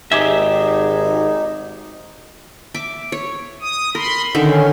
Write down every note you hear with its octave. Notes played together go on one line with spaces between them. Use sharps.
G#1 D#4 G4 G#4 E5
E5 D6
C#5
D#6
A#4 B5 C6
D3 D#3 C#4 E5